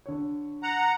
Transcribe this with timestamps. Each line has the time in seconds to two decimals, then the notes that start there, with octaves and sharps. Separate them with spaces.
0.06 D3 C#5
0.63 F#5 A#5